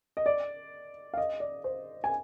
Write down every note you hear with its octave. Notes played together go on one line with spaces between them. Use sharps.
D#5
D5
F5
D#5
D5
C5
G#5